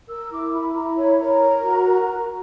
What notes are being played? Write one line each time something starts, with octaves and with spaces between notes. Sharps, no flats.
A#4 E6
E4 D6
E4 B5
E4 A#5
C#5 B5
A#4 A#5
A#4
F#4
A#4